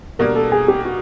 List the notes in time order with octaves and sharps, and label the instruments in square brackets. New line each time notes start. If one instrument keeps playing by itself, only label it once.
[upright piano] B2 G3 A#3 D4 [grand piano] A#4
[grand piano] A4
G#4
G4
F#4